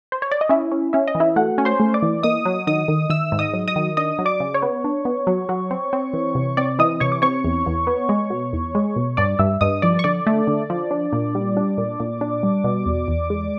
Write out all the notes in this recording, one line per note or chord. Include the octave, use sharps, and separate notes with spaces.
C5
C#5
D5
D#5
C#4 E4 E5
C#4
C#4 E5
D#5
E3
E4 E5
A3 F#4 F#5
C#4
C5 C6
A3
D5 D6
E3
A#3 D#5 D#6
F#3
D#3 D#5 D#6
D#3
D#3 E5 E6
G#2
D#5 D#6
F#3
D#5 D#6
D#3
D4 D#5 D#6
F#3
D5 D6
C#3
C#5 C#6
B3
D4
B3
F#3
F#3
C4
C4
E3
C3
C4 D5 D6
E3 D#5 D#6
C3 C#5 C#6
D6
C4 C#5 C#6
E2
E2
B3
G#3
B2
E2
G#3
B2
G2 D5 D6
G2 E5 E6
G2 D#5 D#6
F3 D5 D6
C#6
D3 D5 D6
A3
D3
F3
D4
A#2
G3
D4
A#2
A#2
D4
G3
B2
E2
E2
G#3